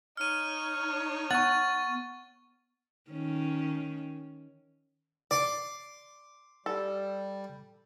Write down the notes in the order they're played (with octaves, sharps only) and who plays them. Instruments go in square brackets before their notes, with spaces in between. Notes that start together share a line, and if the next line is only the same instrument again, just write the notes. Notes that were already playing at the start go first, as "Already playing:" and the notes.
[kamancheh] D#4 C#5 [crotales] F6 D#7
[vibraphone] B3 [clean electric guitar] F#5 [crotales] C#6 A6
[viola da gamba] D#3 C#4
[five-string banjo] D5 [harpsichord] C6 D6
[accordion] G3 [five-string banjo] A4